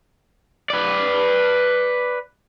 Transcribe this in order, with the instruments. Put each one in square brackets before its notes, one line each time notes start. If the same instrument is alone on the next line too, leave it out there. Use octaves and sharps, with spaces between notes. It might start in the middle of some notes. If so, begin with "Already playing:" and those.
[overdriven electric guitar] B4 D5